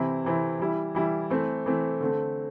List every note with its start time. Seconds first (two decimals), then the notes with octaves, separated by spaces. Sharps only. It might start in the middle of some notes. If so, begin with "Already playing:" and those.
Already playing: C3 E3 C4 E4
0.24 C3 E3 C4 E4
0.59 E3 G3 E4
0.95 E3 G3 E4
1.30 E3 A3 C4
1.66 E3 A3 C4
2.00 D3 A3 C4